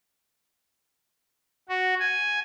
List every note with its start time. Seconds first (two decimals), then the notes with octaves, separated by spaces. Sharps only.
1.69 F#4
2.00 G#5